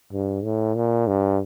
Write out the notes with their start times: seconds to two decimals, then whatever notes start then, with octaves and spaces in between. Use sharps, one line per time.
0.13 G2
0.44 A2
0.75 A#2
1.08 G2